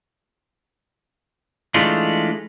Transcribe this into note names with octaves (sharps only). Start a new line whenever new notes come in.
E3 G#3 A3 D4 D#4 F4